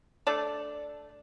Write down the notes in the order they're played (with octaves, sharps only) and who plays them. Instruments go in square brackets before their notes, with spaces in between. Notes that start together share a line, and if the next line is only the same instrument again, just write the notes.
[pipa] A3 D4 A4 D5